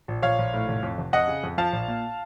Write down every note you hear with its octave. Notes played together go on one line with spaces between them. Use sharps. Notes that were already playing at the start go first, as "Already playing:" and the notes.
A#1
A#1 C#5 F5
A#1
A2
F1
F2
F1
F2 D#5 F#5
C#3
F2
F3 F5 A5
A#1
A#2